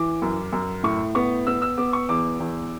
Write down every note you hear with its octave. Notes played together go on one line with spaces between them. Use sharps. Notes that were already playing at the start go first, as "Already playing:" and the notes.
Already playing: E3 D6
F#2
F#2
A2 C#6
B3 C#6
B3 E6
E6
B3 D6
C#6
E2 D6
E2